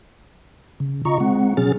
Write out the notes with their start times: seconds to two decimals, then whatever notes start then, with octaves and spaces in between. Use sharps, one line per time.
0.80 C#3
1.05 C#3 F4 D#5 A#5 C#6
1.20 G#3 C4 F#5
1.57 B2 F#3 C#4 G#4 F6 A6